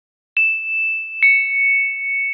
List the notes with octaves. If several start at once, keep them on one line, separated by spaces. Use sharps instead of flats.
E7
C#7